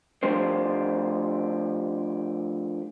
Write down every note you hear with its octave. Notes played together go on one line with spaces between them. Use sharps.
F3 A3 D4 G4 C5